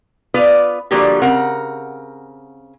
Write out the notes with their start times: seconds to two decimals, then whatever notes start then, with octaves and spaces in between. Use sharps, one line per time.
0.34 B3 F4 B4 D5
0.91 D3 F3 G3 A#3 F#4 G4
1.22 C#3 C4 A#4 F#5